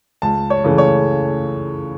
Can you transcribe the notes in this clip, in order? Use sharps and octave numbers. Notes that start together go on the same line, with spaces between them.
C#2 A5
C#5
C#3 E3 A3
C#5